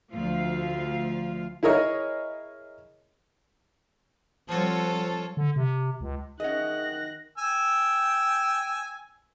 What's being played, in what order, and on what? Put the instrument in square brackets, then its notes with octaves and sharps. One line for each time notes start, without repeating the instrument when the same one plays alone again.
[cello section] D2 F3 F4 F5
[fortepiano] E4 G#4 A#4 C#5 D#5
[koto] F3 F#4 [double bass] G3 C4 [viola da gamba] F4 A4 C#5 [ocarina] A5
[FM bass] D3
C3
C#2
[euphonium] D#3 [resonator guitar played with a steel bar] C#4 D#5 [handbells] G#4 E5 F#5 [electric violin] F#6 A#6
[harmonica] G5 G#5 E6